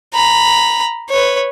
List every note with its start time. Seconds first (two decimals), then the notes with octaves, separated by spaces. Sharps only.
0.14 A#5 B5
1.09 B4 C#5